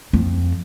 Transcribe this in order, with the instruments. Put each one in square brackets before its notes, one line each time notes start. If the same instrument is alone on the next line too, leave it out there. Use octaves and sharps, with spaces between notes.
[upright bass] F2